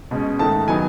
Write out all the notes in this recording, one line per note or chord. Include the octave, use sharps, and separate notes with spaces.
B2 G#3 C#4
G#2 D#3 A3 A5
D#3 F#3 B3 D#4 G#5